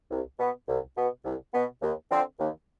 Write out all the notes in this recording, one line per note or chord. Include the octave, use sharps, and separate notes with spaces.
C2
B2 B3
C2
B2 B3
C2
B2 B3
D#2
D3 F3 C4
D#2